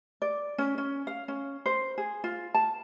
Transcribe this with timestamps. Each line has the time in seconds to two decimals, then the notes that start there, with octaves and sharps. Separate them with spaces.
0.22 D5
0.58 C#4
0.78 C#4
1.07 F5
1.28 C#4
1.66 C5
1.98 G#4
2.24 F4
2.54 A5